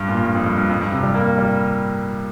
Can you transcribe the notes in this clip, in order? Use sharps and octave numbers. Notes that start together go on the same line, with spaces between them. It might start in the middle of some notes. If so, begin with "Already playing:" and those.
Already playing: G2
A#2
G2
F2
G2
G2
F2
G2
C3
G3
A#3
G3